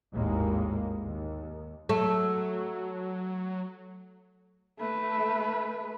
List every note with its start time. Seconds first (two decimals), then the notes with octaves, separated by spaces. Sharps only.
0.14 G#1 D#2 A2 G#3 A#3
1.03 D#2
1.89 F#3 A3
4.79 A3 B4